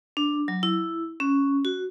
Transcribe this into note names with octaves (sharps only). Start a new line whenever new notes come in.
D4
F#3
E4
C#4
F#4